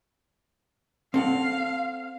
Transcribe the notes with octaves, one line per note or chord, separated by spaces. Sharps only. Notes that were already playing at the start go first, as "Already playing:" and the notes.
C4 A4 F5 F#5